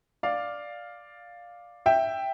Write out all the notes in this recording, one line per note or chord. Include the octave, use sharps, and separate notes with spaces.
D5 F5
E5 G5